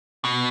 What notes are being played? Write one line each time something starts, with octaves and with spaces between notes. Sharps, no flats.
B2